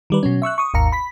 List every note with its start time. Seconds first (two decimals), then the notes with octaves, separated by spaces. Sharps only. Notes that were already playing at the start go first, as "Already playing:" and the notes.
0.10 D#3 G3 B4
0.23 B2 F#3 C#4
0.42 E5 C#6 E6 F#6
0.58 C#6 D#6
0.74 G#1 D#2 F5 A#5 C#7
0.92 B5 B6